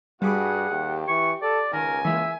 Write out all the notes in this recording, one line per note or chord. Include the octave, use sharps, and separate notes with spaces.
G2 G3 F#4 G#4 F#5 B5 D6
D#2 G4
E3 C#6
A4 D5
C#2 D#3 A#4 G#5
E3 G#3 A#3 E5